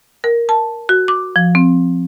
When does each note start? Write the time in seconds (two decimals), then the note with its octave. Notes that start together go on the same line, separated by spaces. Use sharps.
0.24 A#4
0.49 A5
0.89 F#4
1.08 D6
1.36 F3
1.55 C4